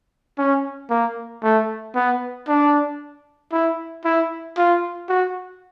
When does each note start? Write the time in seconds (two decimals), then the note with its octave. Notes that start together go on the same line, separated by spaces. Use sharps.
0.38 C#4
0.90 A#3
1.43 A3
1.95 B3
2.48 D4
3.52 E4
4.05 E4
4.58 F4
5.09 F#4